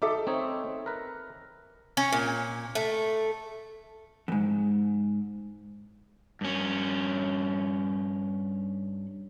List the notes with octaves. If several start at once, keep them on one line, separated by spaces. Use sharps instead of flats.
D#4 A4 E5 D6
C4 D#4 C#5
A#4 B4
C#4
A#2
A3
F2 G#2
G2 C#4